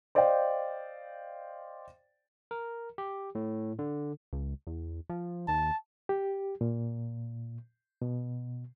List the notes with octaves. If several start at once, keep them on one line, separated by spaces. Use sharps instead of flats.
C5 D5 D#5 F5 G5
A#4
G4
A2
D3
C#2
E2
F3
D#2 A5
G4
A#2
B2